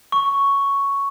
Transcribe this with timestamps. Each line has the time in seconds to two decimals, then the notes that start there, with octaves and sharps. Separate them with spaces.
0.12 C#6